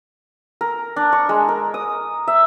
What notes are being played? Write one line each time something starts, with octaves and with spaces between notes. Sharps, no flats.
A#4
D4
C#6
G#3
A#4
D#6
E5